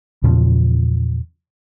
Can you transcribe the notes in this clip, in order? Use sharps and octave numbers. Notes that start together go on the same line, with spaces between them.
E2 A#2 C#3 F3